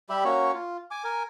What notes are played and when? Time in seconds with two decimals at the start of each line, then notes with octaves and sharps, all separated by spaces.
0.10 G3 G4 E5 B5
0.24 A#3 C#4 F#4 C#5
0.54 F4
0.91 G#5 D6
1.04 A#4 G#5